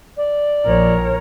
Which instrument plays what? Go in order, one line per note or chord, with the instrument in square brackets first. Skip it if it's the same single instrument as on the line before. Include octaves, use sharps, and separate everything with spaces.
[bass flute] D5
[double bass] A#1 [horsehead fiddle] A#4 C#5